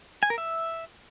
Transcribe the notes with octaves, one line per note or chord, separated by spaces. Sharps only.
G#5
A#4
E5